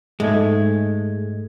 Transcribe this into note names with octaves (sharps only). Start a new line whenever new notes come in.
G#2 G#3 A3 G#6